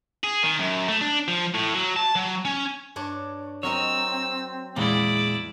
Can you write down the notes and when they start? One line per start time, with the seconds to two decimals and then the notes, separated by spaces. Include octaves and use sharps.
0.24 G#4
0.43 D#3
0.60 F#2
0.89 A3
1.01 D4
1.28 F3
1.54 A2
1.74 F#3
1.96 A5
2.16 F#3
2.45 C#4
2.96 G2 D4 C#5
3.63 F#3 C4 A#4 C#5 D#5 E6
4.76 E2 A#2 G#3 E4 D5